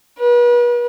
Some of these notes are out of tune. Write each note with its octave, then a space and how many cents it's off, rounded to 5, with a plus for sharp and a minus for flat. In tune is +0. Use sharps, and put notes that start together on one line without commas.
B4 -40